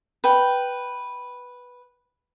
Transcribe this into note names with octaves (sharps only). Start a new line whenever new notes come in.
B4 G5